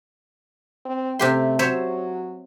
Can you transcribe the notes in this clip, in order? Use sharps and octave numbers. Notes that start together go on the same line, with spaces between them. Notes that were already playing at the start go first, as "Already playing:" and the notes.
C4
C3 A3 G4 C6
F#3 C5 C#5 E5